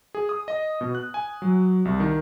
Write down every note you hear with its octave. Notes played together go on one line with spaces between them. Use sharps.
G#4
D#6
D#5
B2
F#6
G#5
F#3
C2
D#3